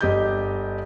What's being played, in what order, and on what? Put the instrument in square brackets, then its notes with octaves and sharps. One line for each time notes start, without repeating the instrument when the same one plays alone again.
[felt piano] G1 G4 D#5 G6